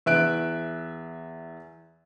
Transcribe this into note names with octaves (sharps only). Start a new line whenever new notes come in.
E2 E5 F#6 D7